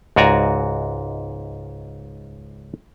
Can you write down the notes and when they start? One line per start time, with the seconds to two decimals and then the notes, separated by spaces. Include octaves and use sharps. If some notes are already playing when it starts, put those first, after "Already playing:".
0.16 C#2 G#2 F#4 D5 G#5 A#5